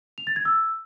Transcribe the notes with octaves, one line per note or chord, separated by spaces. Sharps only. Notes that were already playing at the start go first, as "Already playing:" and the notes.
F7
A6
G#6
E6